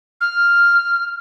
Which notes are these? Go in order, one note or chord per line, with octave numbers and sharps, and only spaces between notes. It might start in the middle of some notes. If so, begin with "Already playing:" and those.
F6